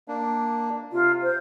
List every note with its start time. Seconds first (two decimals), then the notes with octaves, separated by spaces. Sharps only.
0.08 A#3 D4
0.93 C3 F4
1.23 C5